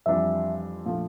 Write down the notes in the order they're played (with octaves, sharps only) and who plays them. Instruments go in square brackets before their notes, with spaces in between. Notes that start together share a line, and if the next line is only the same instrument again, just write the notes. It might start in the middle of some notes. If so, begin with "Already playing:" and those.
[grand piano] F2 E3 G3 D4 [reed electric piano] E5
[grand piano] A#2 F3 A3 D4